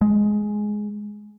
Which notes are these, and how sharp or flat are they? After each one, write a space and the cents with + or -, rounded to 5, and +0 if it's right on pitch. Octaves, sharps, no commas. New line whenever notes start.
G#3 +10